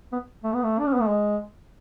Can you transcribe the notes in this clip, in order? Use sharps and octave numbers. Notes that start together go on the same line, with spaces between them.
B3
A3
B3
A3
D4
C#4
B3
A3
G#3